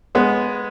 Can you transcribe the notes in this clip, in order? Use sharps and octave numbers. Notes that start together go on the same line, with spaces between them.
G#3 B3